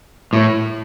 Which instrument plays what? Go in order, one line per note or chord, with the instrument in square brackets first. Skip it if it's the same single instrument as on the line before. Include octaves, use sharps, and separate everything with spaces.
[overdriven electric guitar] A2